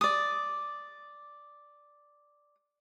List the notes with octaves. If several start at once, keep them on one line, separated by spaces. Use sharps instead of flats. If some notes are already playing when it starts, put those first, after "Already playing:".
D5 D#6